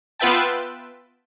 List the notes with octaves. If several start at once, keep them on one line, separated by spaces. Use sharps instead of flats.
B3 F4 B4 E5 G5 A5